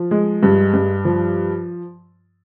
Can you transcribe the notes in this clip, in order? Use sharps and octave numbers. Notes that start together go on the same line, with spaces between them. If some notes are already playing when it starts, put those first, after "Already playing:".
Already playing: F3
G#3
G2
G2
F3